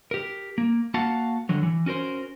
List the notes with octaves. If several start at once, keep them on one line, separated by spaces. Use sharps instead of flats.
G4 A#4
A#3
A#3 F#4 F5 F#5 A5
D3 D#3 F#3
E3
C#4 F#4 A#4 C5